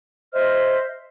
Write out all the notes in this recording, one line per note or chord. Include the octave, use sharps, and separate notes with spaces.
C5 D#5 E5 F6